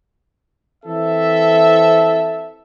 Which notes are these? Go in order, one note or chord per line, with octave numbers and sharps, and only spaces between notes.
E3 C4 A4 E5